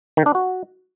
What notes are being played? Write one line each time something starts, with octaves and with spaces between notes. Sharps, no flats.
D#3
D4
F#4